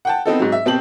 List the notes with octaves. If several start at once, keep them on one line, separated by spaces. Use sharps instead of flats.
F#5 G5 A5
B3 C4 D#4 A4
G#2 F#3
E5
B2 C4 G4 A5 F#7